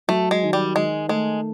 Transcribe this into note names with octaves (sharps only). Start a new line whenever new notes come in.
F#3 A3
G#3
D#3
G3
D#3 G#3
G#3 A3